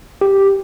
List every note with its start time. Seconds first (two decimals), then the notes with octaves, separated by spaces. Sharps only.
0.21 G4